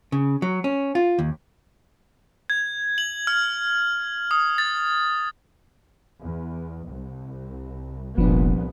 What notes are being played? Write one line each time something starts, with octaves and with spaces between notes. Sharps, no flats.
C#3
F#3
C#4
F4
D#2
G#6
F#7
F6
D#6
A6
E2
C2
F1 C2 A#2 F3 B3 D4